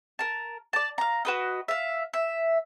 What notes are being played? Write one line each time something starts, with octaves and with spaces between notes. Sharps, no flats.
A#4 A5
D5 A5
F5 A#5
F#4 B4 D#5
E5 F5
E5